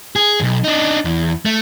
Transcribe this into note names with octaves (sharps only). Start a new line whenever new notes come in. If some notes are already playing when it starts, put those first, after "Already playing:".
G#4
B1 E2
D4 D#4
E2
A3